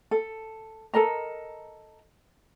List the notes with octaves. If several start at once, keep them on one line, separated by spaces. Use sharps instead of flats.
A4
A4 A#4 D#5 A#5